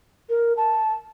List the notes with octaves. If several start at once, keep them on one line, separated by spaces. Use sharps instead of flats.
A#4
A5